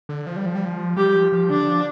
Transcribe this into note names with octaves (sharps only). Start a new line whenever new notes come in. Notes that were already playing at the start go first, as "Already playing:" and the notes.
D3
F3
G3
F3
G3
F3
G3 G4
F3
F3
D3 D4
F3